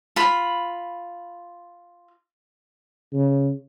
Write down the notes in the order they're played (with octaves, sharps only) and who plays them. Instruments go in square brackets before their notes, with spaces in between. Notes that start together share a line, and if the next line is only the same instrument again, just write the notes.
[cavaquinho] F4 B5
[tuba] C#3